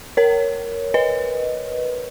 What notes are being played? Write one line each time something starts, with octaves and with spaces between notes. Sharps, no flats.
A#4 C#5
B4 D#5